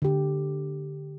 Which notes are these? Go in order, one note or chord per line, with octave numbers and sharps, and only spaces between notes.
D3 G4